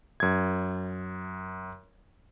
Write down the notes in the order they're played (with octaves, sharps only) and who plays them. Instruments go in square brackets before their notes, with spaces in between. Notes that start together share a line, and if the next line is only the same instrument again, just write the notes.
[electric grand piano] F#2 G#6